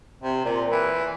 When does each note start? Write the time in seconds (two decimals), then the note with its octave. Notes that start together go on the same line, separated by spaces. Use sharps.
0.23 C3
0.45 A#2
0.71 E3